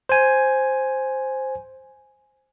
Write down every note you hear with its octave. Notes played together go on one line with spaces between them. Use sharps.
C5 G#5